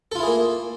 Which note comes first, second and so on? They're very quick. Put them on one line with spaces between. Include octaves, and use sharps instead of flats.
A4 F4 E4 G#4 A#3